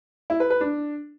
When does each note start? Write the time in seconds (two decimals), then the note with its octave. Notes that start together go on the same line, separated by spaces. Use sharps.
0.30 E4
0.40 B4
0.50 B4
0.61 D4